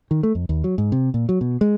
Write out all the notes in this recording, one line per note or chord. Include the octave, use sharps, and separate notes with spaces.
D#3
A3
F2
D#2
F#3
G#2
C3
A#2
F#3
B2
G#3